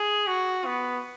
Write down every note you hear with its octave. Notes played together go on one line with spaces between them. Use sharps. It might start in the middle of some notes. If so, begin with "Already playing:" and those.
Already playing: G#4
F#4
B3